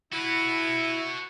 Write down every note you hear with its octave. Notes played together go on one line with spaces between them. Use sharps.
E4 F#4 B4